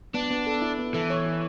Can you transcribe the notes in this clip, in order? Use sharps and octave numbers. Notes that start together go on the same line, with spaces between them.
B3 D4
B3
A4
E4
B3
E3 A4
C#5
E4